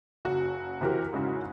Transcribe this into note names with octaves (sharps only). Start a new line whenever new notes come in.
F#1 C#3 F#4
C3 E3 F#4 G4 A#4
G#2 C#3 C#4 E4 F#4